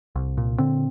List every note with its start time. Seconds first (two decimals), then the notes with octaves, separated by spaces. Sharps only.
0.16 C2
0.37 A#2
0.59 D3 C4